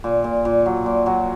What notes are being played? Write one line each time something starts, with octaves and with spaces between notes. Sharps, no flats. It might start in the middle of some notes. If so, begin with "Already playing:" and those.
A#2
A#2
A#2
F#3
A#2
F#3